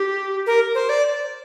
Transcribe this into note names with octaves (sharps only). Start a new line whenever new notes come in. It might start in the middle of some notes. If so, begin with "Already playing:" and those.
Already playing: G4
A#4
C5
D5